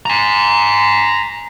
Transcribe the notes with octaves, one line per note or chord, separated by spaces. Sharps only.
G#5 A#5